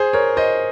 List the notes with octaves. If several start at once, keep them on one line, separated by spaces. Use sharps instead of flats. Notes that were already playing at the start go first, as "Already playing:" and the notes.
Already playing: G#4 C5
A#4 C#5
C5 D#5